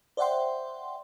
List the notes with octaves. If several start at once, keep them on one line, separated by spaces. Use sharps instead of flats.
C5 D5 E5 F#5 G5 C6